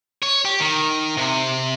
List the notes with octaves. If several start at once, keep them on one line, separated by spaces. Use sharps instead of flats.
C#5
G4
D#3
C3